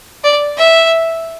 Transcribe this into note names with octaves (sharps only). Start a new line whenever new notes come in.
D5
E5